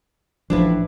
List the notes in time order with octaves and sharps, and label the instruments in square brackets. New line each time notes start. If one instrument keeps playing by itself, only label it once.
[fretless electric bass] A1 F3 [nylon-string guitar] D4 E4 B4